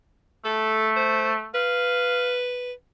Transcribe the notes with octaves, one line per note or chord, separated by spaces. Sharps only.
A3 A4
C5
B4 F5